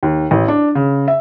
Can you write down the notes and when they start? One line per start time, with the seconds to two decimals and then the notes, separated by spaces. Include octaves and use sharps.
0.03 D#2
0.31 A1
0.48 D4
0.75 C#3
1.08 E5